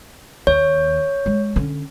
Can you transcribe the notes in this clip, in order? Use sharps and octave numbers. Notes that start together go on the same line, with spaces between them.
D#2 C#5
G#3
D3 C#4